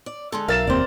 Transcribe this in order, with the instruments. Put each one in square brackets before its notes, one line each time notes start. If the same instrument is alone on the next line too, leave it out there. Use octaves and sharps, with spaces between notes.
[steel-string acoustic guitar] D5
D3 G#3 A4
[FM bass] B1 [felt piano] A#4 A6 E7 [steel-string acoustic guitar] E5 F5
[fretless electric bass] F1 C4 [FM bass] D#2 [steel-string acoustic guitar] C5 D5